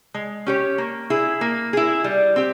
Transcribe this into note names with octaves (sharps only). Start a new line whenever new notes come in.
G#3
C#4 G4 C#5
A#3
E4 G#4
A#3
E4 G#4
G3
C4 G4